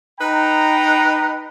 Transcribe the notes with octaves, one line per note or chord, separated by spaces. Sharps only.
D#4 B4 G5 A#5